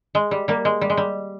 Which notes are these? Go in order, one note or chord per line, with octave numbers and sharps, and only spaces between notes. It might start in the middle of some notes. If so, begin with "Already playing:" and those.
G#3
G3
G3 A#3
G#3
G3
G#3
G3